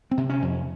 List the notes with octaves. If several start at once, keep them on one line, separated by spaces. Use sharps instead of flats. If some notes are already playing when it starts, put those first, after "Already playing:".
C4
C3
C#4
F2